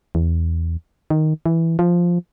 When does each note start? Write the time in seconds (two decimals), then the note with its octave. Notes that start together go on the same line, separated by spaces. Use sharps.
0.15 E2
1.10 D#3
1.46 E3
1.79 F3